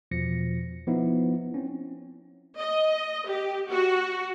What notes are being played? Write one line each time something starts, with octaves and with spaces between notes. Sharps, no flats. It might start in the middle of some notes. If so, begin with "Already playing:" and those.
E2 B2 F3 A#6 C#7
F3 B3 D#4 E4
C4 C#4
D#5
G4
F#4